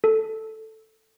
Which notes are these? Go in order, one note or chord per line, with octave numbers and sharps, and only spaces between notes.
A4